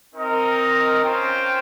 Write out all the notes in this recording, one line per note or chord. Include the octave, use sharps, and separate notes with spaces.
C4 D#4 A#4 D#5
C#4 F4 C5 G5